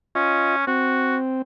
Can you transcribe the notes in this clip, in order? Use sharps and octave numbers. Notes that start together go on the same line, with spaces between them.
C#4 F4 D#5
C4 F#4